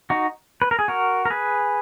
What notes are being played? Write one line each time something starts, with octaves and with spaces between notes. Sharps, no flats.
D#4 F#4
B4
A#4
G#4
F#4 A#4
A#4
G#4 B4